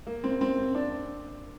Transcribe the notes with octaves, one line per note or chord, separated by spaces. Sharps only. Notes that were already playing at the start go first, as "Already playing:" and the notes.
A#3
C4
C4
D4